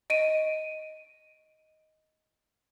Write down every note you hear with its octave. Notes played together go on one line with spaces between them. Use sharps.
D#5 D7 D#7